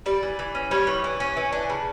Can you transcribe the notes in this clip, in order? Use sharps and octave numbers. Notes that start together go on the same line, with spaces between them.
G3 D5
E3
E3
C#4
G3 C#5
E3
E3
C#4
E3
D4
C#3